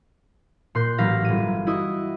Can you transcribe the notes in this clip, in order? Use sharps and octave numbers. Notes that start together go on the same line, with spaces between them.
A#2 C6 F#6 G6
A1 F#3 F5 A#6 B6
G1 D#7
E4 F#4 D#5 D#6